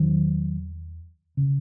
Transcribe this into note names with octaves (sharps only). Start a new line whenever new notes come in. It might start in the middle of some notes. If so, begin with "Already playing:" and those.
Already playing: E2 D#3 F#3
C#3